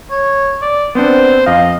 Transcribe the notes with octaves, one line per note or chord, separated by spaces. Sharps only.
C#5
D5
B3 C4 D4 C5
F2 D#5 F5